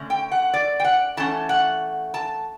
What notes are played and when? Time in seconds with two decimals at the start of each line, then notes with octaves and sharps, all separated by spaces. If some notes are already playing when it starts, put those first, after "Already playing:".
Already playing: D3 A3 C#4
0.10 G5
0.32 F#5
0.54 D5
0.80 G5
0.84 F#5
1.17 E3 A3 C#4 A5
1.49 F#5
2.14 A5